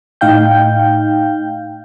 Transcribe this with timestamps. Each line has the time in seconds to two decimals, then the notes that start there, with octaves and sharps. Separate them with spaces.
0.21 A2 D#4 F5 G5 G6